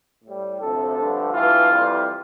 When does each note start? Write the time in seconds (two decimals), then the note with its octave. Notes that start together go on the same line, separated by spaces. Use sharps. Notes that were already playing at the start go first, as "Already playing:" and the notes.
0.24 A2 G3
0.61 D2 C3 F3 A3 A4
0.97 G2 D3 F3 A3
1.33 G2 E3 A3 F4
1.68 F2 E3 G3